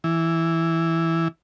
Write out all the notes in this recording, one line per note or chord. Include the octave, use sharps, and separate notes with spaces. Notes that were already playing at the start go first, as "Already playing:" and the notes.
E3